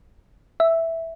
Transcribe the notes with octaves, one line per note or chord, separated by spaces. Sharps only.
E5